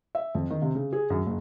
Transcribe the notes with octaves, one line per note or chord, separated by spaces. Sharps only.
E5
F2
D#3
C3
C#3
G#4
F#2
F#1